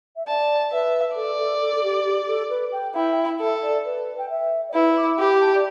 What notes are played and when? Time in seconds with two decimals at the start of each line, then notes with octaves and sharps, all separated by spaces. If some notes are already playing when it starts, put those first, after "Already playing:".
0.16 E5
0.27 D5 A5
0.71 B4 E5
1.16 A4 D5
1.39 A4
1.61 A4
1.76 A4
1.84 G4
2.05 G4
2.27 A4
2.50 B4
2.72 G5
2.95 E4 G5
3.39 A4 E5
3.63 D5
3.85 B4
4.18 G5
4.30 E5
4.69 D5
4.74 E4 B4
4.97 D6
5.18 G4 B5
5.41 A5
5.55 D5